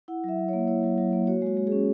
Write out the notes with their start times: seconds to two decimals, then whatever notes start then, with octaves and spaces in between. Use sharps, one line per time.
0.08 E4 F#5
0.24 F#3 E5
0.39 F#3
0.48 A#3 C#5
0.67 E4 C#5
0.83 F#3
0.98 F#3
1.13 A#3
1.27 F#4 C#5
1.42 G#3 F#4
1.57 G#3
1.67 C#4 G#4